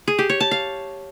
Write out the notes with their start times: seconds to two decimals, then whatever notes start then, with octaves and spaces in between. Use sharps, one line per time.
0.08 G#4
0.19 G4
0.29 C#5
0.40 A5
0.51 F5